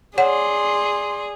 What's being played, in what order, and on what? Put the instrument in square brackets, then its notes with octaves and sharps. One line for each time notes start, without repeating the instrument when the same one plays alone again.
[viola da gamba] G#4 [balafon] C#5 F#5 [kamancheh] D5 C6